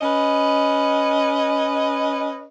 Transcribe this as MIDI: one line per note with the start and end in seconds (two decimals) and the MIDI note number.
0.02 2.45 61
0.02 2.45 71
0.02 2.45 75